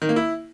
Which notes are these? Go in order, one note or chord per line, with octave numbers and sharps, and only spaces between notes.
D#3
A#3
E4